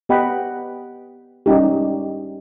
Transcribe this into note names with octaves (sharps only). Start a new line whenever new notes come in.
B3 G4 D#5 F#5 G5 B5
G3 C#4 D#4 G4